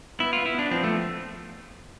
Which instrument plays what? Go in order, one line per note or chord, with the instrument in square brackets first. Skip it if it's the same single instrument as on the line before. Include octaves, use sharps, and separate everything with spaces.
[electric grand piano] B3 [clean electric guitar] E4
[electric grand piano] B3 [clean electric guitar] F4
[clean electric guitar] E4
[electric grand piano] B3 [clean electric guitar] D4
[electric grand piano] F3 [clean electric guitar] C4
[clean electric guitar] A3